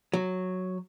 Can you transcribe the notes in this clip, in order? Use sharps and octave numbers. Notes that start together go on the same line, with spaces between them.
F#3